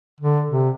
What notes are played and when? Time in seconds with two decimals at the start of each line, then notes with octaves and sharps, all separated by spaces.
0.21 D3
0.50 C3